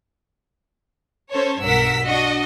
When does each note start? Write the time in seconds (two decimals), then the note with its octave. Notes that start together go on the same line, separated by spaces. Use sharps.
1.31 C#4 A4 C5 C#5
1.62 B1 G2 A#4 F#5 E6 B6
2.04 D4 F#4 D#5